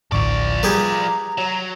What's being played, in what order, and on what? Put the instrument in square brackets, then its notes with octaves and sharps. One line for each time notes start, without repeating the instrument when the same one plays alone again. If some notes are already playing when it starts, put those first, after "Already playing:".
[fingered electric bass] A1 D2 A2 [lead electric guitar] F3 D5 [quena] C#6
[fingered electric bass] G3 [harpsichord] G4 G#4 B4 [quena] A#5
[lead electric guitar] F#3